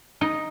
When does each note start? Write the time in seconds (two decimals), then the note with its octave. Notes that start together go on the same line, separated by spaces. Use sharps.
0.21 D#4